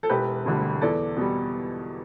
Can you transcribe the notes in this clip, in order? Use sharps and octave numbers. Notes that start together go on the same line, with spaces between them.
A4
E1 G4 B4
D2 D3 G3
E2 A4 D5
B2 G3